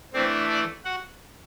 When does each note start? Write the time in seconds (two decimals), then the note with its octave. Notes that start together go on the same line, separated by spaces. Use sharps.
0.13 E3 A3 C4 D4 C5
0.49 D4 D5
0.84 F#4 F#5